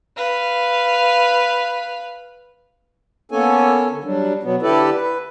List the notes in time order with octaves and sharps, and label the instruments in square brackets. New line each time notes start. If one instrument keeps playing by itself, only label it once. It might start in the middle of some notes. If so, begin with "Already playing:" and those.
[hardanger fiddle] B4 F5
[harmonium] A#3 B3 C#4 A4 C#5 G#5
D3
F#3 G3 D4
B2 F#3 B3
D3 E4 G4 A4 B4 D5
B4